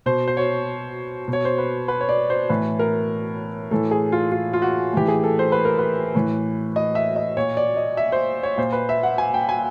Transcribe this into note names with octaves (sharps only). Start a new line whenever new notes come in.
B2 C5
C5
C#5
B2
C#5
C5
B4
B4
C#5
D5
C5
A2 E3 B4
A#4
A2 E3 A4
G#4
F4
F4
F4
F#4
A2 E3 G4
G#4
A4
C5
B4
A#4
B4
A2 E3
D#5
E5
D#5
A#2 C#5
D5
D#5
E5
C5
C#5
A#2 C5
B4
E5
F#5
G#5
G5
G#5